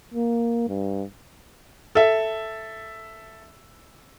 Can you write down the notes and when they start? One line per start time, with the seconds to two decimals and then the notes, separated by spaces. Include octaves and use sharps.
0.14 A#3
0.68 G2
1.95 A4 E5